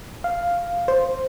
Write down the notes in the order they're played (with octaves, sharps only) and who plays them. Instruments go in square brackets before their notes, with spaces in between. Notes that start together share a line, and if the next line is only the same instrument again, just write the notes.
[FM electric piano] F5
C5